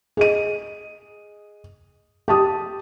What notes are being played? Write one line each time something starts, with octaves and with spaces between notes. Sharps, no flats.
G#4 D#5 D#7
G4 A5 D#6